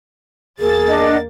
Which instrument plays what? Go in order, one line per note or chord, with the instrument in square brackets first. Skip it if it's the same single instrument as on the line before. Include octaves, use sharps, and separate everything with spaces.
[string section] E2 A#3 A6 [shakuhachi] G#4
[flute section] D4 D#5 F#5